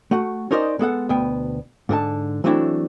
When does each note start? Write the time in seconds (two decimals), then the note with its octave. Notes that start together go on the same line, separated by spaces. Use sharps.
0.11 A3 F#4 F#5
0.51 C#4 D#4 A#4 C5 D5 D#5
0.79 G#3 B3 A4 F#5
1.09 D2 B2 B3 G5
1.89 G#2 D3 A#4 A5
2.44 E3 F#3 A3 C4 D4 E4